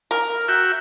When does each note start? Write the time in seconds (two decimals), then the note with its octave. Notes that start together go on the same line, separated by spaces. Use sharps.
0.11 A#4
0.48 F#4 E5 G5